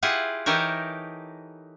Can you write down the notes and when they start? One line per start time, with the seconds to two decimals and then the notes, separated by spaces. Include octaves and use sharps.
0.03 E4 F4 G4 G#4 F#5
0.46 E3 D#4 G4 A4 A#4 C#5